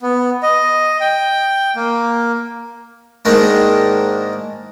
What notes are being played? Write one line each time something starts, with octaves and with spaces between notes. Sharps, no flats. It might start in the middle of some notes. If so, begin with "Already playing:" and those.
B3
D#5
G5
A#3
G#2 D#3 A#3 D4